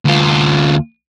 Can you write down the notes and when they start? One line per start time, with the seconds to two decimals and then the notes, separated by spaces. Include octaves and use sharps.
0.05 D2 F4